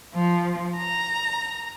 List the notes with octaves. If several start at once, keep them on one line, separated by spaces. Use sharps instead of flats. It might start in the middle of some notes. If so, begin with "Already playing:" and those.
F3
A#5